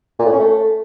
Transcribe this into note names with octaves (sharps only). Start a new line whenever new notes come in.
A#2
A2
C#4
A3